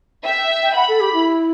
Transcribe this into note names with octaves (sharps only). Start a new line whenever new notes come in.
E5 G5
G5
G5
F#5 B5
A4
G4
E4